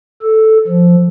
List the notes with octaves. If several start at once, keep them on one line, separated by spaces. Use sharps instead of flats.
A4
F3